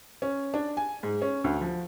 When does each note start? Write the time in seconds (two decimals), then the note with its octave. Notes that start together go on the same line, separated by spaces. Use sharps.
0.22 C#4
0.54 D4
0.77 G#5
1.03 G#2
1.22 C#4
1.44 D2
1.61 F3